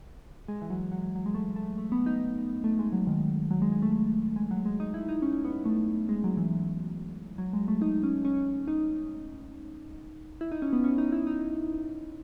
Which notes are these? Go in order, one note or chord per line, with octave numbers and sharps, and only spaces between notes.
G#3
E3
F#3
F#3
F#3
G#3
A3
A3
A3
B3
D#4
A3
G#3
F#3
D#3
F#3
G#3
G#3
A3
G#3
F#3
G#3
D#4
E4
D#4
C#4
B3
A3
G#3
F#3
E3
F#3
G#3
A3
D#4
C#4
C#4
D#4
E4
D#4
C#4
B3
C#4
D#4
E4
D#4